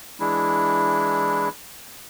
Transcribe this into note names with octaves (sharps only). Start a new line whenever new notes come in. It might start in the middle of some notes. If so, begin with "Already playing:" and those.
E3 G#3 D4 E4